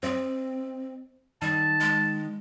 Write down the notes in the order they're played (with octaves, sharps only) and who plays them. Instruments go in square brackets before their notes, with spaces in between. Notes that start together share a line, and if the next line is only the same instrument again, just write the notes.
[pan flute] C4 [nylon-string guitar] C5 D#5
[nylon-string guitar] D#3 [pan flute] G3 [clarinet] A5
[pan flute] G#3